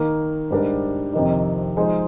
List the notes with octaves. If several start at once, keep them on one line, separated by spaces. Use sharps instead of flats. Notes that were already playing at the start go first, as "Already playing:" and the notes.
Already playing: D#3 A#3 D#4
G#2 G3 D4 G4 A#4
F2 C3 D#3 A#3 D#4
F3 G#3 D#4 G#4 C5